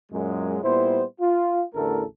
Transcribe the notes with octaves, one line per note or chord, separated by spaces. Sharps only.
F#2 A#2 F#3 G#3
A#2 G3 B3 E4 C5
F4
A1 E2 D3 A3 A4 A#4